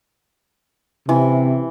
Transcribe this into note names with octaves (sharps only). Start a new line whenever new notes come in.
C3 E3